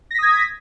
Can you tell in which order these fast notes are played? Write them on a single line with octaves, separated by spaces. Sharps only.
A#6 B6 D#6 G#6